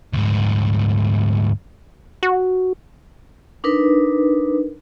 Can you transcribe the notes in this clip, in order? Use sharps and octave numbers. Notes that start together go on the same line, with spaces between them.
D2 G#2
F#4
D4 D#4 A#4 B4